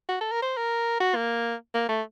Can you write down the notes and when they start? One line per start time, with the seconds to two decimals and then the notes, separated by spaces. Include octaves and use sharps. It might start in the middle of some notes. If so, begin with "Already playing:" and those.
0.09 F#4
0.20 A4
0.31 A#4
0.42 C5
0.57 A#4
1.00 F#4
1.15 A#3
1.74 A#3
1.88 A3